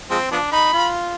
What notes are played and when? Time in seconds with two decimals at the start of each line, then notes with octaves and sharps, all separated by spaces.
0.10 F3 G#3 C4
0.31 F3 B3 D4
0.52 D#4 B5
0.73 F4